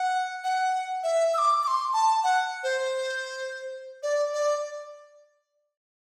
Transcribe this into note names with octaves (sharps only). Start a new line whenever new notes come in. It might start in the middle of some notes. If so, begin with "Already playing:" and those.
Already playing: F#5
F#5
E5
E6
D6
D6
C6
A5
F#5
C5
D5
D5